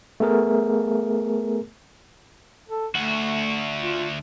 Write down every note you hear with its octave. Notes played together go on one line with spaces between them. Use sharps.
A3 B3 G#4 A#4
A4
D2 A3 F#4
F4